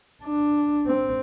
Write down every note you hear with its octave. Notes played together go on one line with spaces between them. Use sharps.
D4
C4